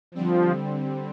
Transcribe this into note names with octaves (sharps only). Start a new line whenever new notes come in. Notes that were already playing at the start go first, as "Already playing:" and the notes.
D3 F3 G3 C4